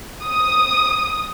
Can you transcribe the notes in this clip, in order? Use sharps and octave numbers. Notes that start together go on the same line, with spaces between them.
D#6